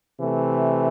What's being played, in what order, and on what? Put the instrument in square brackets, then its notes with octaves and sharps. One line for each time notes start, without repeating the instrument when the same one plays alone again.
[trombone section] C3 E3 A3